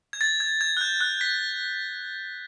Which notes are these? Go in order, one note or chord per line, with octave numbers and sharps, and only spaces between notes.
G#6
A6
G#6
G#6
F#6
G6
F#6
B6